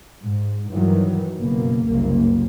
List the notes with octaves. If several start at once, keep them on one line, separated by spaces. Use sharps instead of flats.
G#2
G2 D#3 E3 F#3
F#1 B2 A#3
F#1 C2 A#3